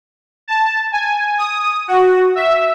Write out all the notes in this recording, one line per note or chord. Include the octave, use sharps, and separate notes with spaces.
A5
G#5
D#6
F#4
E5